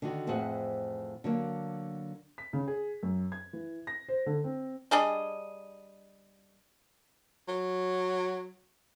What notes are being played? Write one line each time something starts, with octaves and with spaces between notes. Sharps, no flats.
D3 D#3 F#4
F2 A2 E3 G#4 C5 F#5
D3 F#3 A#3
B6
C#3
G#4
F#2
G#6
E3
A#6
C5
D3
C4
G3 D4 G#4 D#5
F#3